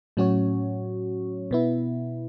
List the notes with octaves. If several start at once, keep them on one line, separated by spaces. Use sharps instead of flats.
A2 F#3 C#4 F#4 C#5
B2 B3 E4